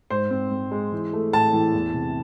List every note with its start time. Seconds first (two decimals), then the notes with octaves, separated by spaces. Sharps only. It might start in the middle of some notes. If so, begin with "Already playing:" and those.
0.10 G#2 C5
0.31 C4
0.51 C4
0.71 G#3
0.92 E3
1.13 A3
1.33 A2 A5
1.53 E3
1.74 E2
1.94 C3